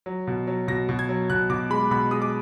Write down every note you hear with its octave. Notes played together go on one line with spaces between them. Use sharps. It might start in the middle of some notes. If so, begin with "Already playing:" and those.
F#3
B2
F#3
B2 A#6
B2
G#6
F#3
B2 F#6
B2 D6
G#3 B5
B2 B5
G#3 D#6
D6